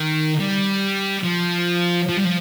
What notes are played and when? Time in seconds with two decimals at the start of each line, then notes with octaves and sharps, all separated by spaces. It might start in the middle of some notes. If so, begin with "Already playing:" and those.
Already playing: D#3
0.40 G3
1.24 F3
2.09 F3
2.17 G3
2.24 F3